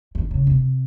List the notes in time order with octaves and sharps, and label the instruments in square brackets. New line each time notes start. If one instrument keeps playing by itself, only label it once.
[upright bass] D#3
C#3
C3